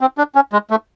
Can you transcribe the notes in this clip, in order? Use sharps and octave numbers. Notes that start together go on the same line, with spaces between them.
C4
D4
C#4
G#3
A3